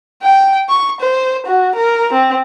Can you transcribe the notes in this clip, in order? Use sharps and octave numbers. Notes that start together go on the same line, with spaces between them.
G5
C#6
C5
F#4
A#4
C4